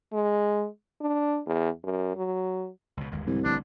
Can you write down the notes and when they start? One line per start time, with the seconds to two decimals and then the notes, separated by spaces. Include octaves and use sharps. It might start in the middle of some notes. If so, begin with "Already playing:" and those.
0.13 G#3
1.01 D4
1.46 E2
1.84 F#2
2.16 F#3
2.97 C#2 B2
3.12 G1 D#2 G#3
3.27 C2 G#2 D3 E3
3.44 A1 D3 A3 D4